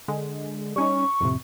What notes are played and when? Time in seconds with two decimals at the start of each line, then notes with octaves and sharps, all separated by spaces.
0.08 D3 G#3
0.76 G3 C#4 D#4 C#6
1.21 F2 A2 C3